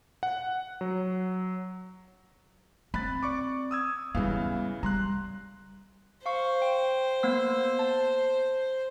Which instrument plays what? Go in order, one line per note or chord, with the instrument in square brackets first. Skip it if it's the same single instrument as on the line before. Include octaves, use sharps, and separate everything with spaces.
[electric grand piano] F#5
F#3
[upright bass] C4 [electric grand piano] B5 F#6 A6
[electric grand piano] D5 C#6 D6
D#6 E6 G#6
[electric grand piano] C#3 E3 F5 [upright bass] G3 B3
[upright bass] G3 [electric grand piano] A#5 C6 F#6
[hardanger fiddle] C5 [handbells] F5 C#6
[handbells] G5
A#3 B3 E6
A5